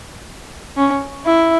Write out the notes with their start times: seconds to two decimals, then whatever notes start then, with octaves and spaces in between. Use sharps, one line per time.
0.77 C#4
1.26 E4